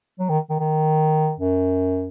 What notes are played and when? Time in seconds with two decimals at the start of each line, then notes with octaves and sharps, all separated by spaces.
0.19 F#3
0.29 D#3
0.50 D#3
0.60 D#3
1.40 F#2